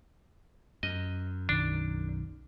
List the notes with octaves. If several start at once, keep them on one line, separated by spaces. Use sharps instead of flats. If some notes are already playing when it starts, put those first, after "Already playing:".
F#2 D#5
B1 D#3 D4